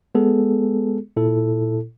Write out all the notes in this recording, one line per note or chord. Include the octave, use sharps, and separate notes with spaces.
G#3 B3 G#4 A4
A#2 E4 A4